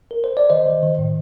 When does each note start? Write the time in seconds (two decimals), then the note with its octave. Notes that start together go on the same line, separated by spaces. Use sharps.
0.11 A#4
0.24 C5
0.37 D5
0.50 D#3 C5 D#5
0.66 D#3
0.83 D#3
0.99 A2